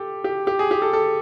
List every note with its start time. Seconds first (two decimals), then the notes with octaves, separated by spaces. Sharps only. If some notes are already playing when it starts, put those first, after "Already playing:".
Already playing: G4 A4
0.24 G4
0.47 G4
0.59 G#4
0.71 G4
0.82 A4
0.93 A4